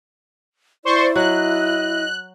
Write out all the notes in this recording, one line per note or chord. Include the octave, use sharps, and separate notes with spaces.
E4 C5 D5 C6 C#6
F#3 D#5 F#6